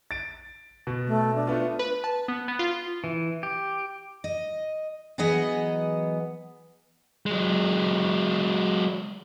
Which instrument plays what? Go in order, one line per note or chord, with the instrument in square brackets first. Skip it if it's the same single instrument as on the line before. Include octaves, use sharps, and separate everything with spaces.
[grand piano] A6 D7
B2
[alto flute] A3
D4
[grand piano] A3 B3 F4
[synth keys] B4
A5
B3
B3
F4
[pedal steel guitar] E3
G4
[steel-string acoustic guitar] D#5
E3 F#3 B3 G#4 D#5 F#5
[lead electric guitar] F#3 G#3